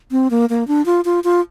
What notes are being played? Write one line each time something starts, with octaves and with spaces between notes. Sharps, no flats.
C4
A#3
A#3
D4
F4
F4
F4